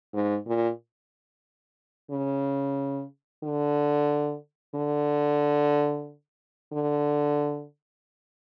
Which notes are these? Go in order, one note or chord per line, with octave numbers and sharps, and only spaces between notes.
G#2
A#2
C#3
D3
D3
D3